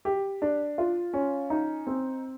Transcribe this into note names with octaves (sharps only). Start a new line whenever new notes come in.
G4
D4
F4
C#4
D#4
C4